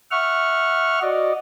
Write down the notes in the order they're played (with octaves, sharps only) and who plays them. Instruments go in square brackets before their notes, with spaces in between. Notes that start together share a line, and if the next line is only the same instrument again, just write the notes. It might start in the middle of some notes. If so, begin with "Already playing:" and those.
[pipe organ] E5 F#5 C#6 F6
F#4 D5 D#5